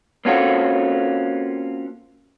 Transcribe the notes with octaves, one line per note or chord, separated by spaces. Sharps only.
A#3 C4 C#4 F4 F#4 A4